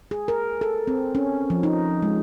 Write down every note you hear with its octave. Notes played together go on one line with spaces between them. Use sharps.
G#4
A#4
A4
C4
C#4
F3
D#4
G#3